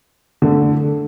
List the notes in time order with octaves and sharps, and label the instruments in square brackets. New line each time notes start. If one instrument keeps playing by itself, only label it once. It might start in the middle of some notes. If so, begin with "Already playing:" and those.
[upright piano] D3 A3